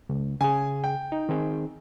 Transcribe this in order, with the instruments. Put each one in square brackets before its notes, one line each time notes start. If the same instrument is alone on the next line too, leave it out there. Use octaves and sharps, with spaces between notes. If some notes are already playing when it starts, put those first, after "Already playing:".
[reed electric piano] C#2
[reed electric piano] C#3 G#4 [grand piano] G#5
[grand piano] G5
[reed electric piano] D#4
D#3 C4 G#4